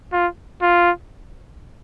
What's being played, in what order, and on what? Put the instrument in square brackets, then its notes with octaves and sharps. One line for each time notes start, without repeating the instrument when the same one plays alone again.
[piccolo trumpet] F4
F4